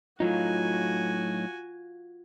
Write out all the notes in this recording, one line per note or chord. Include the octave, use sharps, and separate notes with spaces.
A2 F#3 D#4 F4 F#4 G#5